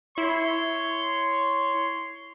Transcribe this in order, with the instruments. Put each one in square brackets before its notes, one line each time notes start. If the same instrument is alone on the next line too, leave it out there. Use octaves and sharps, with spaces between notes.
[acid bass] E4 [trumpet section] C#5 C6